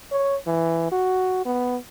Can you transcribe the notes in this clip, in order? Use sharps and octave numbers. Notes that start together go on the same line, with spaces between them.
C#5
E3
F#4
B3